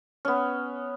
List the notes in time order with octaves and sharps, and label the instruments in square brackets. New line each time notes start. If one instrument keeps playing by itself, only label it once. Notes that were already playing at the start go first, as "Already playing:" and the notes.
[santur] B3 C#4